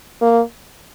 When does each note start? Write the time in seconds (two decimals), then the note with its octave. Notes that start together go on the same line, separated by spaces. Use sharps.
0.21 A#3